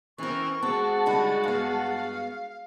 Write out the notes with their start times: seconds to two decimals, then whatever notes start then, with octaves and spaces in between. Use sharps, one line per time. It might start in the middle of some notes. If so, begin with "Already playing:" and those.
0.18 E3 C4 C#4 A#4 C#6
0.63 G#3 C4 F#4 F#5 A5
1.06 D3 G3 D#4 B5
1.43 G2 B3 F5